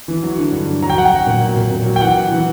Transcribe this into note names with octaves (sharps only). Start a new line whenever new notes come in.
E3
F#3
D3
G2
D3
F#3 A#5
G5
F#3 F#5
G5
F#3
A#2
F#3
A#2
A#2
F#3
G5
E3 F#5
E3
E3